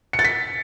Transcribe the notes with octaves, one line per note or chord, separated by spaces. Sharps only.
C#7
A6
B6